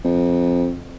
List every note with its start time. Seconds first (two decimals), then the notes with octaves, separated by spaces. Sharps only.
0.04 F2